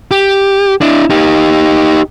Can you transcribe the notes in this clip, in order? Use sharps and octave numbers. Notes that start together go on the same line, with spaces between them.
G4
D4 E4
D#4 G4